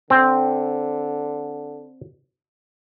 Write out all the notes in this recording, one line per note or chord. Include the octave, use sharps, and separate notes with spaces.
D3 C4